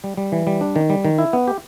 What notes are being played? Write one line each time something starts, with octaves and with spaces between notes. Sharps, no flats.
G3
G3
E3
G3
D4
D#3
G3
D#3
E4
B3
G4